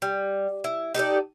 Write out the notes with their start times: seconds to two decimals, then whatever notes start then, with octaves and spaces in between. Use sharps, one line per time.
0.02 G3
0.64 E4
0.94 D#4 G4 A4 D5